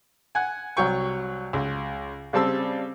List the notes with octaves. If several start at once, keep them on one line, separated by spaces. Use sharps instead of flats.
F#5 G#5
C2 F#3 G5 C#6
C#2
C#3 G3 C4 A5 E6